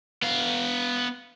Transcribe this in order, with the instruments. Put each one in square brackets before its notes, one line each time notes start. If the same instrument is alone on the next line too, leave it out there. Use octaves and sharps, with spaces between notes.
[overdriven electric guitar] B3 F5